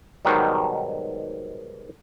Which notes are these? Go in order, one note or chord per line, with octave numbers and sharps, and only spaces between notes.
G#2 B2 D#3 F#3 G3